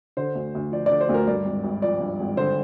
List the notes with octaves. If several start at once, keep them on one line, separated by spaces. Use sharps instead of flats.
D3 C5
D2
D2
F3 D5
D3 D5
C5
D2
A#4
G2 D5
G#1
G#1
F3 D5
G2
G#1
D3 C5